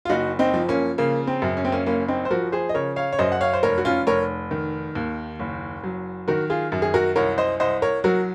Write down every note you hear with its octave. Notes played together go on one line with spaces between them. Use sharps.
F4
F#1 D#4 F#4
C4 D#4
F3
A#3 C#4
C#3 A#3
C4
F#2
C#4
C4
A#3 C#4
F#1 A#3 C#4
C4 D#4
C5
F3 F#4 A#4
G#4 C5
D#5
C#3 A#4 C#5
C#5 F5
C#5
F#2 C5 D#5
F#5
C#5 F5
C5
F1 A#4 C#5
F#4
C#4 F4
F1 A#4 C#5
D#3
D#2
F#1
F#3
D#3 F#4 A#4
F4 G#4
F#2
G#4
F#4 A#4
C2 A#4 C#5
C5 D#5
C2 C5 D#5
A#4 C#5
F#3 F#4 A#4